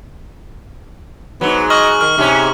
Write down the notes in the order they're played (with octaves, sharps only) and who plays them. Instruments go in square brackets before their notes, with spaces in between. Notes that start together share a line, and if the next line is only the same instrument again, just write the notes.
[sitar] G#2 F#3 [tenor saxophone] B3
[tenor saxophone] D#5 [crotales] C#6 F6 F#7
[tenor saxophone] D#3 [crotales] F6
[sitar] G#2 C#4 [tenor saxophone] C3